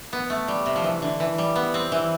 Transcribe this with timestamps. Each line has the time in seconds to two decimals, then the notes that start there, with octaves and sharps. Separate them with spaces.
0.13 B3
0.30 A3
0.48 G3
0.66 C3
0.76 F3
0.84 E3
1.02 D3
1.20 E3
1.38 G3
1.56 B3
1.74 C4
1.92 E3